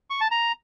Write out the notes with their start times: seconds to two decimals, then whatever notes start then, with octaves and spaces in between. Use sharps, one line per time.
0.10 C#6
0.21 A5
0.31 A#5